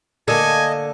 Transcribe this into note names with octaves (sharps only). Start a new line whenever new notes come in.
D3 A#3 A4 D#5 G#5